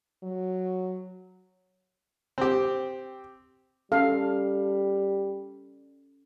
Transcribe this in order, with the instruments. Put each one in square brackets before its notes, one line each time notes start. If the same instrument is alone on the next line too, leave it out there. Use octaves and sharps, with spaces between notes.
[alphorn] F#3
[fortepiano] C4 G4
[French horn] G3 [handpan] C#4 A4 [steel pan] F5